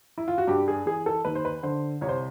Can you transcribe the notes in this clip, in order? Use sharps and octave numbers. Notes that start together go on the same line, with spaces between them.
E4
F4
F#4
G2 G4
G#4
E3 G#4
A4
D#2 B4
C5
B4
D3 C5
C2 C#5
C5